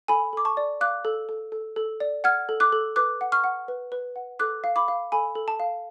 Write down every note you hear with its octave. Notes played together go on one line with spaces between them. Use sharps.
A4 G#5 B5
A4 D6
A5 C#6
D5
F5 D6 F#6
A4
A4
A4
A4
D5
F#5 F6 G#6
A4
D6 F#6
A4
B4 D6 F#6
F#5
C#6 F6
F#5
B4
B4
F#5
A4 D6 F#6
F5
B5 D6
F5
A4 G#5 B5
A4
A5
F5